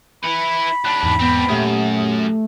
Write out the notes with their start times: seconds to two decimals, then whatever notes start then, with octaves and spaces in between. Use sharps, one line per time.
0.23 E4 B4 B5 C#7
0.85 D#2 D4 A5 F#6
1.03 E2 G#2
1.20 B3 C4 D4
1.49 F#2 A#2 A3 G4 D#6